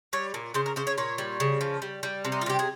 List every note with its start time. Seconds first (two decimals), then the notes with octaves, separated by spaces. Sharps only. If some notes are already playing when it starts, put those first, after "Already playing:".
0.13 G3 C#5
0.34 A#2
0.54 C#3 C5
0.66 A#4
0.76 C#3 C5
0.87 C#5
0.98 A#2 C#5
1.18 G3
1.40 C#3
1.61 F3
1.82 G3
2.03 G3
2.25 C3
2.32 D#4
2.42 F4
2.46 C3 G4
2.59 G#4